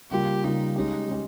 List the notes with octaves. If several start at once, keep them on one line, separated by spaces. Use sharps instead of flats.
C#3 G3 A#3 F4 G4
C#3 G3 A#3 D#4 F4
G#3 C#4 D#4 G4
G#3 C#4 G4